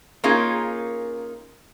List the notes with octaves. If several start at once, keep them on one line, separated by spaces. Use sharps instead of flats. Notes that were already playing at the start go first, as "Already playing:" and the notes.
A#3 C#4 D#4 F4 G#4 A#4